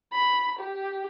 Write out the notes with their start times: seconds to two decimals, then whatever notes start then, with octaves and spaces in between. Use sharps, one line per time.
0.12 B5
0.59 G4